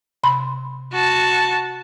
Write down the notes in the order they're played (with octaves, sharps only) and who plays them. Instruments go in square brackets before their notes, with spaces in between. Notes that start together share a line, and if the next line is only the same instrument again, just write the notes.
[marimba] C3 B5 C6
[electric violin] F#4 A5